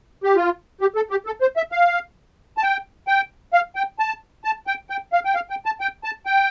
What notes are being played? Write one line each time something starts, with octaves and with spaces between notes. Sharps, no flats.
G4
F4
G4
A4
G4
A4
C5
E5
F5
A5
G5
G5
F5
G5
A5
A5
G5
G5
F5
G5
F5
G5
A5
G5
A5
G5